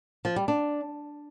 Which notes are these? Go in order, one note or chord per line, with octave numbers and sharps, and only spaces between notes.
F3
G3
D4